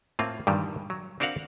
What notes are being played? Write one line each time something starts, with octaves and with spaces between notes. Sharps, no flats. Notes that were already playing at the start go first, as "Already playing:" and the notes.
A2 A#3 C4 F4
G2 A#2 D#3 E3 G3
F#3
C4 D4 F#4 A#4 F5 F#5